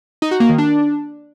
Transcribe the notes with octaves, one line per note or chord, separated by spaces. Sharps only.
D#4
F#4
A#3
D#3
D4